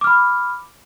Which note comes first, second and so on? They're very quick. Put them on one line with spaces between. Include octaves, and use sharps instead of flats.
D6 F6 B5